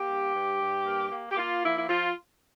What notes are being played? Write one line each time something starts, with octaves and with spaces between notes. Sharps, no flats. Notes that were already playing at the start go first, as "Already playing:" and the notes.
Already playing: A#3 G4
G2
G2
G2
A#3
A#3
G4
A#3 F4
F3 E4
E4
F3 F4